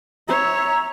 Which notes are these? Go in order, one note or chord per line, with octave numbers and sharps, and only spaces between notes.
C#5 E5 A#5